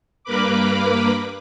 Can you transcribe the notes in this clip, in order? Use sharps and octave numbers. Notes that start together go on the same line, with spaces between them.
G2 A#3 A#4 B4 B5 D6